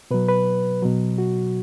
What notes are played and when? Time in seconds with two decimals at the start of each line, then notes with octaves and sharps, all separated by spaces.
0.11 B2 F#3 B4
0.29 B4
0.82 B2 F#3
1.18 F#4